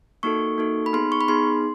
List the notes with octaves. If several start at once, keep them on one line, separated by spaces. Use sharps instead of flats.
A#3 D#4 F#4 A4 C#6
A#3 D#4 F#4 A4
B5
B3 D#4 G#4 C6
C#6
B5
B3 D#4 G#4 C6